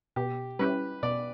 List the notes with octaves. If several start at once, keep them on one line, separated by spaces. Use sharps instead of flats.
B2 G4
G3 C#4 E4 G4 B4
B2 D5